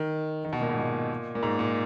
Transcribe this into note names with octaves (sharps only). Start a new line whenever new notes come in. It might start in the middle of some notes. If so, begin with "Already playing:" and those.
Already playing: D#3
D#3
B2
A#2
G#2
A#2
A#2
G#2
A#2